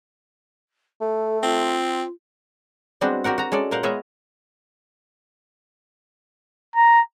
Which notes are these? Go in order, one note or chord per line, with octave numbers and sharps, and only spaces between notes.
A3 A4
C4 F4
G3 G#3 B3 C4 D4 F#4
F#4 G4 A#4 F#5
F#4 A#5
G#3 C#4 A4 D5
A#2 A#4 C5 F5 F#5
G#3 B3 F4 C#5 D#5 E5
A#5